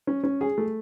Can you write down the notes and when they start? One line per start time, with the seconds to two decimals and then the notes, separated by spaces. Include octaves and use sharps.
0.07 C#4
0.24 C#4
0.41 G#4
0.58 A3